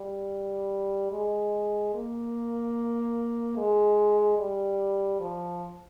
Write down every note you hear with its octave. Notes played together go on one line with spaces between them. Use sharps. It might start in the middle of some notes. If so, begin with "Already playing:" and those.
Already playing: G3
G#3
A#3
G#3
G3
F3